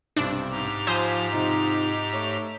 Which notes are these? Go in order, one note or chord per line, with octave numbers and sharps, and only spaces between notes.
B1 G2 C3 D4
G#2 G4 A#5
F3 C5 G#5 D#6 G#6
C3 D#4 F4
A3 C#5